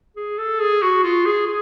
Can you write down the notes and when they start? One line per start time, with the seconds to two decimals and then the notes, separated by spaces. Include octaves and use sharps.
0.17 G#4
0.38 A4
0.60 G#4
0.82 F#4
1.04 F4
1.25 G#4
1.47 G#4